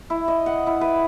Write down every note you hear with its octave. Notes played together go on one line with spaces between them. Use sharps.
E4
D#5
F#5
E4
B4